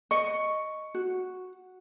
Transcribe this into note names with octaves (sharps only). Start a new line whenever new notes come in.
D#5 C#6
F#4